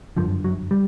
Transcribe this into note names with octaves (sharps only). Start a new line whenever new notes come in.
G1 F#2 D3 F3
F#3
G3